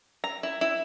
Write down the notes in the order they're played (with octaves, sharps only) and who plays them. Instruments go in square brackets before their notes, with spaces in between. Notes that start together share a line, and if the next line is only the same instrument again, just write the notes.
[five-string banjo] A#5
E4
E4